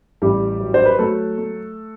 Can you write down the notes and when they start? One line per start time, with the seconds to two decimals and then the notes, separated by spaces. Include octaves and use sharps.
0.22 A1 G3 G4
0.61 F#3
0.74 C5
0.86 B4
0.98 F#3 A3 A4
1.38 A3